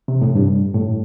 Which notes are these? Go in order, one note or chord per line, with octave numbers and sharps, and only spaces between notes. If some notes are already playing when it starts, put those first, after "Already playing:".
C3
A2
G2
A2